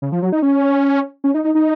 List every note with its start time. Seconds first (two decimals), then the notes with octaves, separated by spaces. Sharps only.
0.02 C#3
0.12 F3
0.22 F#3
0.32 D#4
0.42 C#4
1.24 C#4
1.34 D#4
1.44 D#4
1.55 D#4